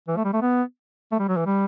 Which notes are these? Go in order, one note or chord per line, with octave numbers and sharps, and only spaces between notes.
E3
A3
G3
A3
B3
A3
G3
F#3
E3
G3